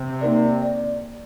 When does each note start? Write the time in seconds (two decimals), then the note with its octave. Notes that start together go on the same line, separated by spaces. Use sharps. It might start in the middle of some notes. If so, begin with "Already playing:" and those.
Already playing: C3
0.21 A#3 D#4 A#4 D5
0.62 D5